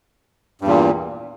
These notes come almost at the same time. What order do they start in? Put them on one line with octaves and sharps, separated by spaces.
G2 E2 A#2